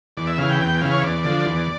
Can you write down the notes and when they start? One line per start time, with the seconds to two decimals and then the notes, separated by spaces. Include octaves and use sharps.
0.17 E2 D5
0.27 E5
0.38 C#3 E3 F5
0.50 G5
0.60 E2 G5
0.81 C#3 E3 F5
0.92 C#5
1.03 E2 D5
1.24 D3 F3
1.46 E2